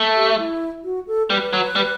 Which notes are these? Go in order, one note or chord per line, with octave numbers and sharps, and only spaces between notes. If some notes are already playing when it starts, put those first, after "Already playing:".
Already playing: A3
G4
E4
F#4
A4
G3 B4
F#3
G3